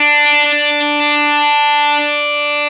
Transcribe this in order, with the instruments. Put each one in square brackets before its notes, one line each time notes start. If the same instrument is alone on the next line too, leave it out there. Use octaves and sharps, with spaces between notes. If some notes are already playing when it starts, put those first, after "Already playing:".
Already playing: [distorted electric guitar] D4